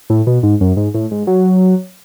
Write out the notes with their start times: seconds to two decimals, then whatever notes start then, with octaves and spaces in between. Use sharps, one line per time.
0.10 A2
0.27 B2
0.43 G#2
0.61 F#2
0.77 G#2
0.94 A2
1.11 G#2
1.27 F#3